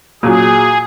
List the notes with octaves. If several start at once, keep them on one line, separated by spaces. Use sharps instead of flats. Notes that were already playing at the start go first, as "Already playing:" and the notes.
A#2 F#3 G#4